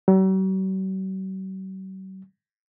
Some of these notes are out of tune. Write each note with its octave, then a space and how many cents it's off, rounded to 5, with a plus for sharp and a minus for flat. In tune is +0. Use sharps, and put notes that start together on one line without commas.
F#3 +45